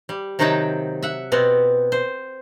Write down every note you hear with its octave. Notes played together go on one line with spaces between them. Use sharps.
G3
C3 D#3 F#3 D#4 G5 A5
E5 F#5
B2 B3 C4
C5